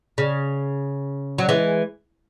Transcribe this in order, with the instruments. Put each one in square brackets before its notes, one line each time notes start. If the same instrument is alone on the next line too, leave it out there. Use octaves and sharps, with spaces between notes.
[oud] C#3
F#3
E3 G#3